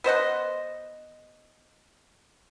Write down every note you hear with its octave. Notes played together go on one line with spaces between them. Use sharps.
B3 C5 D#5 F#5